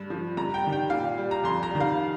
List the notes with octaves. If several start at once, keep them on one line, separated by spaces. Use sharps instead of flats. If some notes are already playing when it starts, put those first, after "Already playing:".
Already playing: G2
F3
G2 A#5
G5
D#3 G3
G5
A#2 F5
G3
A#5
F2 C6
A#5
D#3 G3
F5